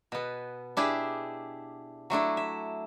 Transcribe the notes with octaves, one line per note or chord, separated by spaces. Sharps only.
B2 B3
D4 E4 G4 G#4
F#3 A3 D4 E4
E5